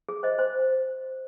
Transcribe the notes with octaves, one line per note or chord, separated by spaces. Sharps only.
G#4
C5 D#5
C5